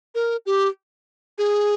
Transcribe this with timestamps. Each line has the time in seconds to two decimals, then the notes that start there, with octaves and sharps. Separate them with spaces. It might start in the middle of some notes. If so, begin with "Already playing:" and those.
0.15 A#4
0.46 G4
1.38 G#4